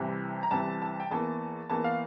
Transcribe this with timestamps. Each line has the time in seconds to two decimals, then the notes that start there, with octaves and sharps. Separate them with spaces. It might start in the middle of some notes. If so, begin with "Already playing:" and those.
Already playing: C2 C3 E3
0.43 A#5
0.51 C2 C3 E3 A5
0.82 A5
1.00 G5
1.11 E2 E3 A#3 A5
1.70 E2 E3 A#3 A5
1.84 F5